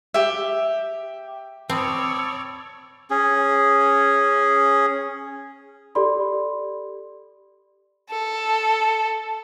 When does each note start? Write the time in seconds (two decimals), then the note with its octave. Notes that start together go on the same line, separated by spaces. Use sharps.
0.14 G4 E5
1.70 C4 C#5 D5 A5 B5 D#6 E6
3.11 C#4 G#4
5.95 G4 A4 D5 B5 C6
8.10 A4